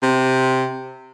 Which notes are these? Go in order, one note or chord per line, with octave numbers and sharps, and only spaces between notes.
C3